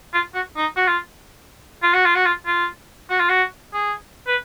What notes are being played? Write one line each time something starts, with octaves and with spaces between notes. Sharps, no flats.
F4
F#4
D#4
F#4
F4
F4
F#4
F4
F#4
F4
F4
F#4
F4
F#4
G#4
B4